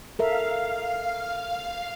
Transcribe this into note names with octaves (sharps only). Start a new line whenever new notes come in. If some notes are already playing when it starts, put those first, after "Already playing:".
A4 A#4 E5 F5